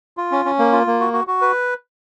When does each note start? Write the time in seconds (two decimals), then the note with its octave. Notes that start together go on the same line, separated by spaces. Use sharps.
0.17 F4
0.32 C#4
0.45 C#4
0.59 A#3
0.73 F4
0.87 A#3
1.00 F#4
1.13 F#4
1.27 F#4
1.41 B4